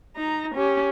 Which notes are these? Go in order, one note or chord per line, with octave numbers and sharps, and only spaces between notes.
D#4 A#5
C#4 G4